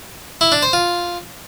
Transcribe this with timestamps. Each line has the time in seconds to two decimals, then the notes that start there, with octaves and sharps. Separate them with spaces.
0.41 E4
0.52 D4
0.63 C5
0.73 F4